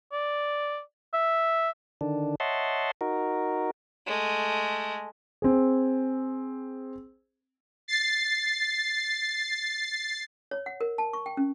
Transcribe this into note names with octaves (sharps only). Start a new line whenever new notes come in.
D5
E5
D3 D#3 D4
C#5 D#5 E5 F#5 A5 C6
D#4 F#4 A#4
G#3 A3
C4 G#4
A6 C7
C#5
F#5
A#4
A5
C#6
G5
C#4